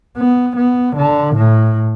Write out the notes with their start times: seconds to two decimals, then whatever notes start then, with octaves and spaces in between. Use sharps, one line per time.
0.18 B3
0.57 B3
0.96 D3
1.36 A2